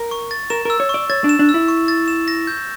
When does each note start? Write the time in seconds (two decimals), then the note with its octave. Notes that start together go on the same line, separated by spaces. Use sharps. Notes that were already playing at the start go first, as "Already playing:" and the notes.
Already playing: A#4
0.11 C#6
0.31 A6
0.50 A#4 E7
0.65 A#4 E6
0.80 C#5
0.89 D5 C#6
1.10 C#5 A6
1.24 D4
1.29 E7
1.39 D4
1.49 E6
1.54 E4
1.68 C#6
1.88 A6
2.08 E7
2.28 A#6
2.47 G6